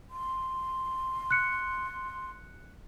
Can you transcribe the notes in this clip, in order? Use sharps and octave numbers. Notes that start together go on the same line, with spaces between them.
C6
F#6 C#7